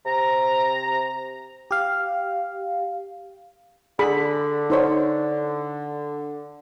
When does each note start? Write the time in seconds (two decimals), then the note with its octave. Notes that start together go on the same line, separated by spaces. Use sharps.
0.06 C3 A#5
1.71 G4 F5
3.99 D3 G#4 B5
4.70 D#4 C5 C#5